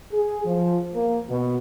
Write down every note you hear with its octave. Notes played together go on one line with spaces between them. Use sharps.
G#4
F3
A#3
B2